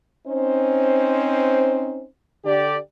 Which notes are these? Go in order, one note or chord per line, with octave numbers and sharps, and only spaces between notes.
C4 C#4 D#4 C5
D3 G4 D5